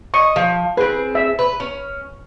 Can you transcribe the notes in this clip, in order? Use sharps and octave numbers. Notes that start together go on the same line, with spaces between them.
D#5 C#6
F3
C4 G#4 B4
E5
B4
C#4